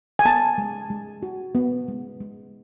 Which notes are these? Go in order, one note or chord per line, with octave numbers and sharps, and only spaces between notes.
G#5
B3 A5
G#3
G#3
F#4
B3
G#3
G#3